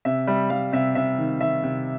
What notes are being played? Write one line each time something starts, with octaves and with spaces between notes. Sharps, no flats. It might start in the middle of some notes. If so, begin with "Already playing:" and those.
C3 E5
G3 E5
G3 F5
C3 E5
C3 E5
D#3
D#3 E5
C3